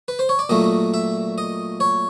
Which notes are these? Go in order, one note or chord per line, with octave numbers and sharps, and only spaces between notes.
B4
C5
C#5
D5
A#2 F#3 A3 D#5
E5
D#5
C#5